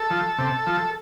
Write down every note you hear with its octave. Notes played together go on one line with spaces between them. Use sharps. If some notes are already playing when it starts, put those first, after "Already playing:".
Already playing: A4
F3
C3
F3